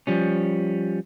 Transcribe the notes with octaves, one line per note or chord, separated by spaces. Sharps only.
F3 G3 C#4